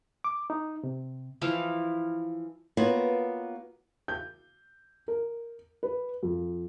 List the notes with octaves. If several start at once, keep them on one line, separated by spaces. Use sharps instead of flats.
D6
D#4
C3
E3 F3 E4 F5
A#3 B3 F4 F#4 B4 C#5
G6
A#4
B4
F2